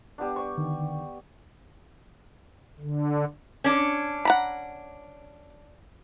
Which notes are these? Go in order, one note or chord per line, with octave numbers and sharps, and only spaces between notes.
G3 B3 D4
C#6
D3 D#3
D3
C#4 D4
F#5 A#5 B5